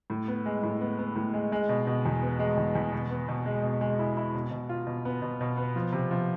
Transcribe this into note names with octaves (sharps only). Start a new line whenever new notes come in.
A2
B3
G#3
A2
B3
B3
A2
G#3
G#3
B2
B2
E2
B3
G#3
E2
E2
B2
B3
B2
G#3
B2
G#3
E4
E4
B2
B2
F4
B2
B3
B2
B2
B3
F3
C3
F3